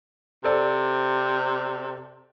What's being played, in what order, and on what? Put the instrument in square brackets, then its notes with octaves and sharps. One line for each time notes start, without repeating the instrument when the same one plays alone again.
[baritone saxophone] C3 [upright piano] A4 C5 D5